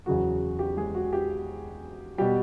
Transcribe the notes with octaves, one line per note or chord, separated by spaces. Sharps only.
E2 C#3 F#3 F#4
G4
G#3 G#4
F#4
G4
B2 G3 G4